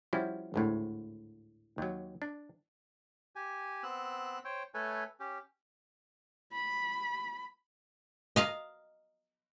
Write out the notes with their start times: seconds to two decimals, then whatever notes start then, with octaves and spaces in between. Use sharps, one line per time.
0.13 F3 G3 C#4 E4 F#4
0.54 G#1 D2 A2
1.78 D#2 F#3
2.22 D4
3.36 G4 G#5
3.83 B3 C4 E6 F#6
4.45 C5 C#5 G5
4.74 A3 A4 B4 C#5 G#5
5.20 C#4 G4
6.52 B5
8.36 D#5 F5 A#5